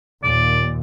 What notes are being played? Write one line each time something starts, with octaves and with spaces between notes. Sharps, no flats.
D#2 A#2 D5